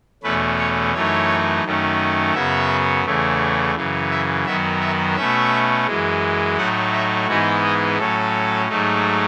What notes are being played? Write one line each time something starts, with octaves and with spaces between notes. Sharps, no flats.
E2 B2 A3 C#4 B4
C#5
F#2 E3 A3 D#4 C#5
F#2 D#3 A3 C#4
F#2 C#3 F#3 B3 E5
E2 C#3 E3 A3
F#2 C#3 E3
E5
F#2 D#3 F#3 B3 E5
E5
B2 A3 C#4 E5
F#2 E3 G#3
A2 F#3 A3 D#4 F#5
E5
G#2 E3 G#3 B3 D#4 F#4
G#4
A2 F#3 C#4 A4
G#2 F#3 A3 D#4